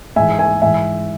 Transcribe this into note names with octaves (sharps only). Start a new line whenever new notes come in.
G#2 E3 E5 G#5
E5 G#5
G#2 E3 E5 G#5